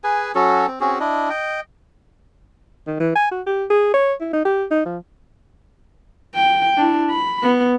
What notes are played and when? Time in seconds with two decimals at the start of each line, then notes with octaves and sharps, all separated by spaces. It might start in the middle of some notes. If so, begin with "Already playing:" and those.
0.04 G#4 B4 G#5
0.35 F#3 C#4 F#4 A4
0.67 C4
0.80 C4 C#4 F#4 G#4
1.00 D4 E4 D#5
1.30 D#5 G5
2.87 D#3
3.00 E3
3.15 G#5
3.31 F#4
3.47 G4
3.70 G#4
3.94 C#5
4.21 E4
4.34 D#4
4.45 G4
4.71 D#4
4.85 F3
6.35 G5
6.77 D4 E4
7.10 B5
7.42 B3